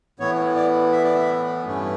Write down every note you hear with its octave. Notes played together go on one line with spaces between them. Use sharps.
A2 E3 B3 C#5
D5
E5
D5
E5
G2 E3 A3 C#4